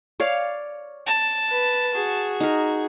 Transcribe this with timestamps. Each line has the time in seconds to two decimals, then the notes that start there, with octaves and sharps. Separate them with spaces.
0.20 C#5 D5 F5
1.06 A5
1.50 B4
1.95 F#4 G#4
2.40 D#4 A#4